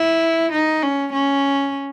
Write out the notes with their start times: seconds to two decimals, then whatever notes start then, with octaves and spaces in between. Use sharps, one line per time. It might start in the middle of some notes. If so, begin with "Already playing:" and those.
Already playing: E4
0.52 D#4
0.82 C#4
1.12 C#4